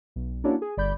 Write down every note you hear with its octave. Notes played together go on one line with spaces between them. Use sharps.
B1
A#3 C#4 D4 E4 F#4 C#5
G#4
G1 D5 B5 G6